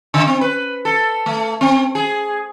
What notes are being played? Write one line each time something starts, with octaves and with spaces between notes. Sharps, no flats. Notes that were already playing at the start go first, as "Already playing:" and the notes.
C#3
C4
B4
A4
A3
C4
G#4